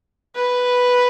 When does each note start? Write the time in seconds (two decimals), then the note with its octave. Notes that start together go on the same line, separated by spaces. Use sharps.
0.36 B4